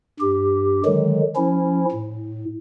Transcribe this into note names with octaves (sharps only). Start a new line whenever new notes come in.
G2 G4
D3 D#3 F#3 G#3
F3 C#4 E4
A2